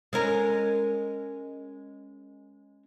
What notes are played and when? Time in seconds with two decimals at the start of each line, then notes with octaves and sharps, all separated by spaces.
0.13 G#3 C#4 A#4